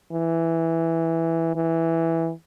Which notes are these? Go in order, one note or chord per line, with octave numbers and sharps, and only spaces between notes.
E3
E3